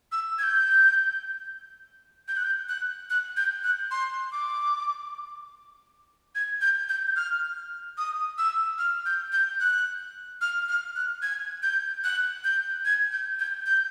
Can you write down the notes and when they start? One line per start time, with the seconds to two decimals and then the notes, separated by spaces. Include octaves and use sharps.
0.12 E6
0.38 G#6
0.43 G6
2.28 G6
2.37 F#6
2.44 G6
2.69 F#6
3.10 F#6
3.37 G6
3.64 F#6
3.91 C6
4.32 D6
6.35 G#6
6.61 G6
6.89 G6
7.16 F6
7.98 D#6
8.38 E6
8.78 F6
9.06 G6
9.32 G6
9.60 F#6
10.41 F6
10.69 F6
10.96 F#6
11.22 G#6
11.63 G6
12.04 F#6
12.44 G6
12.85 G#6
13.12 G6
13.39 G6
13.66 G6